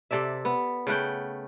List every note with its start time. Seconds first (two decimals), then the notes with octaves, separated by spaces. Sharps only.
0.11 C3 A4 D5 E5
0.45 B3
0.87 C#3 A3 F#5 G5